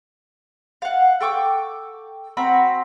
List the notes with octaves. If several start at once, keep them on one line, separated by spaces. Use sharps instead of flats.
F5 F#5
A4 G5 C#6 D6
C4 F#4 A#5 B5